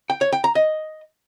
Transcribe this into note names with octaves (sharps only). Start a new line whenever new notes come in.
G5
C#5
G5
A#5
D#5